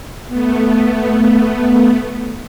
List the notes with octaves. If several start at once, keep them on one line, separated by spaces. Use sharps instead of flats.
A3 B3